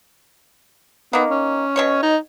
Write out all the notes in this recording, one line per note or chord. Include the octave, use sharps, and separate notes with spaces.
D#3 A#3 B3
C#4
B2 C#5 C#6
D#4